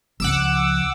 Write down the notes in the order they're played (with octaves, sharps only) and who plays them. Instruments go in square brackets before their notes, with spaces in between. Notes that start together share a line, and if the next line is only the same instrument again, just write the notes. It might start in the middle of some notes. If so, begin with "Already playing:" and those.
[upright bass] C#2 F3 [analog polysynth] F#5 D6 E6